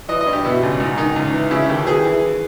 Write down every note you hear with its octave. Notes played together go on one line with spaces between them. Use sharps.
E3 D#5
D#5
G2
G4
B2 E4
C#2
G#2 D#4
D#3 D#4
C#2
E3
C#3 E4
D#2 G4
E3 G#4
E3